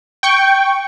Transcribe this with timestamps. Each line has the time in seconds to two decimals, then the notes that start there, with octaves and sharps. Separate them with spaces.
0.23 G5 C#6